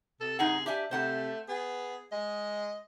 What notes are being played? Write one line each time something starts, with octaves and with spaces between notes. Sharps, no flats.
C3 A4
F#2 D#4 G#4 F#5
D4 G4 E5 G#5
C3 A3 C5 F#5 A5
B3 G#4
G#3 D#5